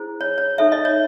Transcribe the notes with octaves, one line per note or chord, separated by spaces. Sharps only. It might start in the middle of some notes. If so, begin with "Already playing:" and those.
Already playing: E4 G#4 C5
C#5
C#5
D#4 A4 C#5 E5
D#5
C#5